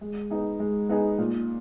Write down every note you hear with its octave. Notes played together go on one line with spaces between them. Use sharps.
G#3
B3 D#4 G#4
G#3
B3 D#4 G#4
A#2